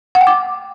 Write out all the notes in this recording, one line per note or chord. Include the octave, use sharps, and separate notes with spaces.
F#5
G5
D6